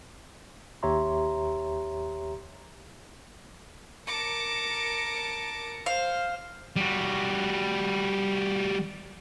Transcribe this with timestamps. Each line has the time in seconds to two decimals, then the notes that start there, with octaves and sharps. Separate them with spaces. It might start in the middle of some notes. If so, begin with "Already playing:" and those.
0.83 D#2 G4 C#5 E5 A#5 C6
4.07 A#4 A5 D6 A#6 C#7
5.86 C5 F5
6.76 G3 F#4